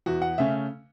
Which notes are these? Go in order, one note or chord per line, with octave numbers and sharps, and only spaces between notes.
E2 F#4
F#5
C#3 A3 C#4 E5